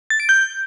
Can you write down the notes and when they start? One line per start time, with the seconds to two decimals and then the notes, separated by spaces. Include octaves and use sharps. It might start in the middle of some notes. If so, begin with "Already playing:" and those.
0.10 A6
0.20 D7
0.29 G6